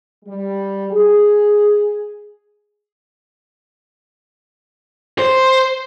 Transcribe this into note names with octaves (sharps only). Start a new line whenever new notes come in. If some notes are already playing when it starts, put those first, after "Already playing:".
G3
G#4
C5